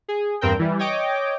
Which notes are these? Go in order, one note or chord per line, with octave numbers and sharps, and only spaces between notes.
G#4
E2 G2 C4 A#4 G5
E3 G3
C#5 D#5 G5 D6